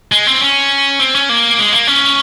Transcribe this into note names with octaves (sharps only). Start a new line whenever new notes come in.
G#3
C4
C#4
C4
C#4
A#3
G#3
A#3
C#4